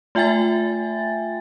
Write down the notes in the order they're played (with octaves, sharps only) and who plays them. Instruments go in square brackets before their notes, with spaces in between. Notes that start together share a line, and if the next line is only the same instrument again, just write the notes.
[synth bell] A3 F4 E5 G5 G#5 A6